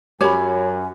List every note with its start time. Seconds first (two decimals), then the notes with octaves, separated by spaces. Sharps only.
0.21 F#2 G4 C#5 G#5 B5